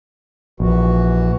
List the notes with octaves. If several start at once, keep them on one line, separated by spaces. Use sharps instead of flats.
A#1 E3 F#4